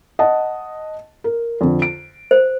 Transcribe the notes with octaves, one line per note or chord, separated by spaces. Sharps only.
D#5 F#5 A5
A#4
F2 D3
D7
C5